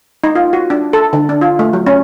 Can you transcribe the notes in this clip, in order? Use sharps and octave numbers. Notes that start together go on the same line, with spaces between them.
D#4
F4
F#4
D4
A4
D3
D4
F4
A3
F#3
C#4